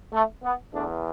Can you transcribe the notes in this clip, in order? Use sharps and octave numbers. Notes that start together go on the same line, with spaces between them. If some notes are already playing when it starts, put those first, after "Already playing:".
A3
B3
E2 E3 A3 D4